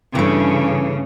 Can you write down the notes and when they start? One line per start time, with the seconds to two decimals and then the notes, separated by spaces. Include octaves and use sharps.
0.15 G2 C#3 E3 A3